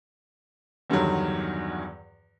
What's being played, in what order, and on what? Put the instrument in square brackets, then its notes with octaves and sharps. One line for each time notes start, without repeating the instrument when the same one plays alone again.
[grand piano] E2 G2 D3 D#3 F#3